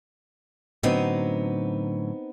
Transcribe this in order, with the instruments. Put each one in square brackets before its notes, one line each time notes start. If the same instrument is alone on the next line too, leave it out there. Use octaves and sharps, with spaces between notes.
[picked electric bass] A2 D3 F#3 [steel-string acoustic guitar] B3 C4 D#4